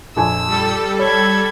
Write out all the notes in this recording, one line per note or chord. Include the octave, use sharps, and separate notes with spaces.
A#1 F2 G#5 E6
G3 A4
C#5 B5 G#6